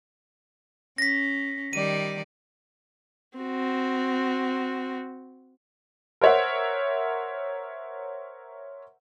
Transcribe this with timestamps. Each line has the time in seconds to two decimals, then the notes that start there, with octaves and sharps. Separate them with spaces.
0.98 C#4 A#6 B6
1.73 D#3 G3 D5 D#7
3.38 C4 F#4
6.21 A#4 C5 C#5 E5 F#5